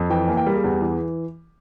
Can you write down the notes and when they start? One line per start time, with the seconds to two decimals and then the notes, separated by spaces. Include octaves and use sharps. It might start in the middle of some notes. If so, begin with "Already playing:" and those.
Already playing: F2
0.10 E3 G5
0.28 A#3 G#5
0.37 G5
0.46 G3 A#4
0.55 G#4
0.64 E2
0.81 E3